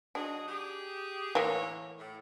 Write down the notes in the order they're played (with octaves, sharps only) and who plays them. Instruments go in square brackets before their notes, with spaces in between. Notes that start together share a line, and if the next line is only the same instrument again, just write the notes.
[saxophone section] F#3 D#4 G#4 [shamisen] D4
[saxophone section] G4 G#4
[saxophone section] A2 D3 C#5 [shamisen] E3 A#3
[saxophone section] A2